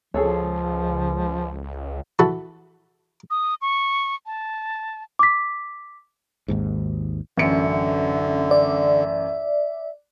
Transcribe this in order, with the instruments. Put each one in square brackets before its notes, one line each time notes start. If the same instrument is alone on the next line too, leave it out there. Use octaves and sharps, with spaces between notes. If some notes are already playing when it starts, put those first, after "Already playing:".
[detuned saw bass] C#2 [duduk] F3 [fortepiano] G#4 A4 C#5
[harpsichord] E3 F#4 A4 B5
[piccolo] D#6
C#6
A5
[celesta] D6 B6
[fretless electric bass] G#1 D#2 G#2
[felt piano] A1 F#2 C#7 [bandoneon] D3 [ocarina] E5
[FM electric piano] D5